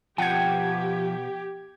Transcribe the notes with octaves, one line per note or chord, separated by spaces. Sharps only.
B2 F3 G4 F#5 G5 A5 G#6